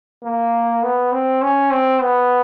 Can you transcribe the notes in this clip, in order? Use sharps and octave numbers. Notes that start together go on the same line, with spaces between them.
A#3
B3
C4
C#4
C4
B3